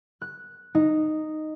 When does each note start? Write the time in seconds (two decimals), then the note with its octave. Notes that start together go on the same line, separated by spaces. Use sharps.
0.22 F#6
0.75 D#4